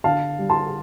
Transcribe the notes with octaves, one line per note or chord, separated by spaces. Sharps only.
D3 F5 A5
G3
A5 C6